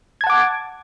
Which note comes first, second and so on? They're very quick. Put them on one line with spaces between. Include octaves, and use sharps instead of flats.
G#6 A5 F#5 D6